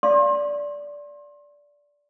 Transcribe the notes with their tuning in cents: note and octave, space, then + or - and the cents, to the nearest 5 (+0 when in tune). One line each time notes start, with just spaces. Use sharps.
D5 -15 F5 +0 C6 +35